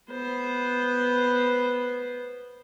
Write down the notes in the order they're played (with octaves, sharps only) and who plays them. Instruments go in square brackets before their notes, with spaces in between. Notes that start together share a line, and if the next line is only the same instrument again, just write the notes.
[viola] B3 C5